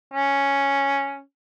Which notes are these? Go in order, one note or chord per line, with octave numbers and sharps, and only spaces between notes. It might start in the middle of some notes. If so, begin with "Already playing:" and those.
C#4